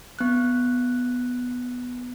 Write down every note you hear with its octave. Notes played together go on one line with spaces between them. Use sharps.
B3 F#6